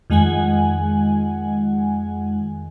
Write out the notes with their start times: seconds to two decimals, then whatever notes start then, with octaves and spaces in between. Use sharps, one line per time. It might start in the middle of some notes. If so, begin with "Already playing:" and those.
0.10 F2 D#3 G#3 F#5 G#5